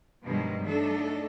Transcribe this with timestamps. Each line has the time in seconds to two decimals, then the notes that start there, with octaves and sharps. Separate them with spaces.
0.23 G2 B2 D#3 F3 F#3 G#3
0.65 F#3 A3 D4 D#4 A4